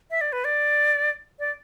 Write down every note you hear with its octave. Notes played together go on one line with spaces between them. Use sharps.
E5
D5
B4
D5
D5